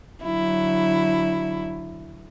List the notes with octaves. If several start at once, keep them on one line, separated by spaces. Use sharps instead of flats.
D3 F#3 E4